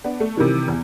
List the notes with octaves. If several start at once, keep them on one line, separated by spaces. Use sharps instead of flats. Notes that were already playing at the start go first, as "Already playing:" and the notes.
B3 D4
A3
C3 D#3 E3 G3
E2